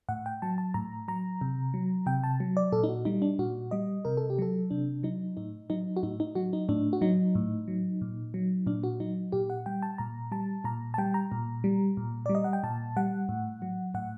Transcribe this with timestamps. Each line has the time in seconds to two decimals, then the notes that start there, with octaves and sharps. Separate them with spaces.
0.09 A2 F#5
0.26 G5
0.42 F#3 A5
0.58 A5
0.74 A2 A#5
1.08 F#3 A#5
1.41 C3
1.74 F#3
2.06 C3 G5
2.24 A5
2.40 F#3
2.57 D5
2.72 A#2 A4
2.84 D#4
2.89 F#4
3.05 G3 D#4
3.22 D4
3.39 A#2 F#4
3.71 G3 D#5
4.05 C3 A#4
4.17 A4
4.30 G4
4.39 F#3 A4
4.70 C3 D4
5.03 F#3 D#4
5.37 A2 D#4
5.70 F#3 D#4
5.97 F#4
6.03 A2 D#4
6.20 D#4
6.35 F#3 F#4
6.53 D#4
6.69 A2 D4
6.93 F#4
7.01 F#3 D#4
7.35 A2
7.68 F#3
8.02 A#2
8.34 F#3
8.67 A#2 D4
8.83 F#4
9.00 F#3 D#4
9.32 A#2 G4
9.50 F#5
9.66 G3 G5
9.82 A5
9.98 A#2 A#5
10.32 G3 A5
10.64 A#2 A#5
10.94 A5
10.98 G3 G5
11.14 A#5
11.32 A#2
11.64 G3
11.97 A#2
12.26 G3 D5
12.35 D#5
12.44 F#5
12.53 G5
12.63 A#2 A5
12.97 G3 F#5
13.29 A2
13.62 F#3
13.94 A2 F#5